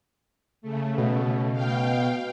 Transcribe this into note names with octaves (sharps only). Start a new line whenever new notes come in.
C#3 A3
B2
F5 G5